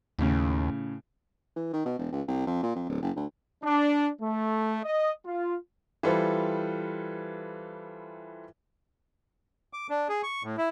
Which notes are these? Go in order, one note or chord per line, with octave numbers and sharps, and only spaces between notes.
D#2 A2 C#3
E3
D#3
B2
E1
C#2
C2
F2
A#2
F2
D1
F#1
D2
D4
A3
D#5
F4
E3 G3 F4 A4 B4 C5
D6
D4
G#4
C#6
A2
E4